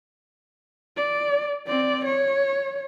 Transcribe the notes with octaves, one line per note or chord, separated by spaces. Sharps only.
D5
C4 D5
C#5